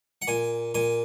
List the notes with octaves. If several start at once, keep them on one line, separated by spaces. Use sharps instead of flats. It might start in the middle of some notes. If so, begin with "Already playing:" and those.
F#5
A#2 G#5
A#2 G#5